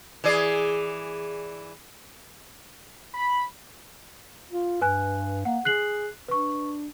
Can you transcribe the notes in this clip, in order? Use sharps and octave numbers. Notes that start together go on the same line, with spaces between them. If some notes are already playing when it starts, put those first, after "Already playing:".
E3 G#4 D5
B5
F4
G2 B4 G#5 F#6
A#3 F#5
G#4 F#6 C7 F#7
D4 B4 C#6